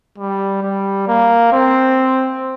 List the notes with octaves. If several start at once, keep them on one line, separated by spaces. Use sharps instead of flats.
G3
G3
A#3
C4